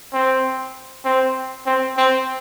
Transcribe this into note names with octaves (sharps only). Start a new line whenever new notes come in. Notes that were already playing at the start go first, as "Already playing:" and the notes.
C4
C4
C4
C4